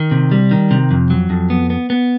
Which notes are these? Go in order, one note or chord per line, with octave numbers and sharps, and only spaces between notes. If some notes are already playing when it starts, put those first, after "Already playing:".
Already playing: D#3
C3
G3
D#3
C3
F2
F#3
F2
B3
B3
B3